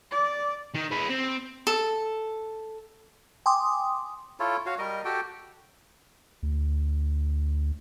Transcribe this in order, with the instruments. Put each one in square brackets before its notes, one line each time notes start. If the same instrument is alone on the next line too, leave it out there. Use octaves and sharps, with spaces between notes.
[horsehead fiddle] D5
[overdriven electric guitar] D#3
G#4 B4
C4
[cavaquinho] A4
[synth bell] G5 G#5 C6 D6 D#6
[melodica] E4 F4 A4 C#5
F#4 C#5 F5
G3 A#4 D#5
F#4 G4 A4 G5
[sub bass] D2